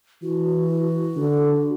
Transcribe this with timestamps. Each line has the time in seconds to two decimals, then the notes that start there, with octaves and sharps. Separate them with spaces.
0.23 E3 F#4
1.17 D3